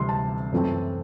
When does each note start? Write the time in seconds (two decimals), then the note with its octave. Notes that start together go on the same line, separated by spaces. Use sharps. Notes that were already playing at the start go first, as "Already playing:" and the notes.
Already playing: D2 C3 E3 G3 C6
0.09 A5
0.52 F#2 E3 A3 C4